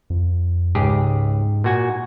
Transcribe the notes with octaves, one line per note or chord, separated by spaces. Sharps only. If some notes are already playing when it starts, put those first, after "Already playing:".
F2
C#2 G#2 G4 G#4
A#2 F#4 G#5